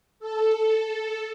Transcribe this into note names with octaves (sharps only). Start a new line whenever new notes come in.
A4